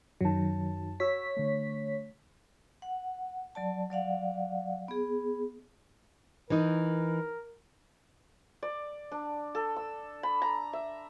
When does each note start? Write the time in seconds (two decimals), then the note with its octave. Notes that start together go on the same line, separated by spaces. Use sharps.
0.21 F#2 D#3 F#3 A5
1.00 F#4 C#5 E6 B6
1.37 D3 A3
2.82 F#5
3.55 F#3 D5 A5
3.90 F#3 D5 F5 F#5
4.88 B3 G#4
6.50 E3 D#4 A#4
8.63 D5
9.12 D4
9.55 A4
9.76 E6
10.23 B5
10.42 A#5
10.73 E5